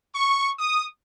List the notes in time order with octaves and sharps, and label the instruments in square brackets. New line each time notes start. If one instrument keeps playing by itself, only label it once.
[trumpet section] C#6
D#6